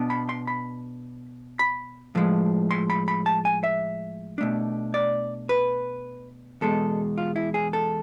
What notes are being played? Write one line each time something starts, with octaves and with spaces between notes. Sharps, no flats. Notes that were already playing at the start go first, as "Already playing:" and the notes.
Already playing: B2 B3 D4
B5
C6
B5
B5
A2 F3 G#3
C6
B5
B5
A5
G#5
E5
B2 A3 D4
D5
B4
E2 B2 G#3 A4
F4
E4
G#4
A4